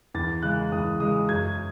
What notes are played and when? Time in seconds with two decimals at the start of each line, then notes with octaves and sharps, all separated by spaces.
0.14 E2 A6
0.43 C#3 G#3 F#6
0.72 E2 D#6
1.00 C#3 G#3 D#6
1.29 F#2 G#6